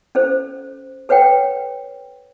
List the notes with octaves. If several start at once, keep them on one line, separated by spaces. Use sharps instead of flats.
C#4 A4 C5
A4 B4 C#5 F#5 G5